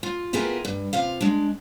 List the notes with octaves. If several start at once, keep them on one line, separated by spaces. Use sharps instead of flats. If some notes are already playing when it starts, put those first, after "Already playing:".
F4
B3 E4 F4 G4 G#4 A#4
G2
C3 F4 F5
G#3 D4